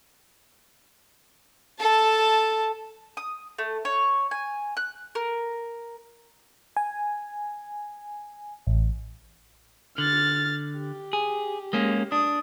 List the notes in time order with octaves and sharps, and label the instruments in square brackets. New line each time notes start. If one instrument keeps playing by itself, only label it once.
[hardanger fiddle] A4 A5
[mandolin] D#6
A3
C#5
G#5
F#6
A#4
[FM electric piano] G#5
A1
[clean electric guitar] D3 [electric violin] F6 A6
[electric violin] G4
[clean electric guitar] G#4
G#3 A#3 C#4
[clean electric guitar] D4 [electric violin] D#6